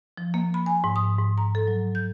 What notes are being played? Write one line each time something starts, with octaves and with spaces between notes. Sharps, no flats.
F3
A#3
B5
G#5
G#2
D#6
G#2
A#5
A4
F#3
G6